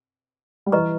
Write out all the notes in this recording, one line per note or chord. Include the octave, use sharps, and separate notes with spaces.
G3
E3 B4 D#5 A#5 C#6